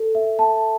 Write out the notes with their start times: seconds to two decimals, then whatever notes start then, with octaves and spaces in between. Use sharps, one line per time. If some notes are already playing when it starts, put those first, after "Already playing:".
Already playing: A4
0.15 E5
0.39 A5